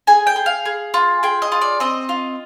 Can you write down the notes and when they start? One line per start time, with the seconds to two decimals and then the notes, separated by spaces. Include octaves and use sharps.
0.07 G#4 G#5
0.27 G5
0.36 G#4
0.46 F5
0.66 G#4
0.94 F4
1.23 G#4 G5
1.42 D#5
1.52 F4
1.61 D5
1.80 C4 D#5
2.09 F4